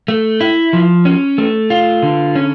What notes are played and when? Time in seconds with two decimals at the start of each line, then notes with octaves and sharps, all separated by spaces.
0.08 A3
0.41 E4
0.73 F3
1.05 C#4
1.38 A3
1.70 F4
2.03 D3
2.35 C#4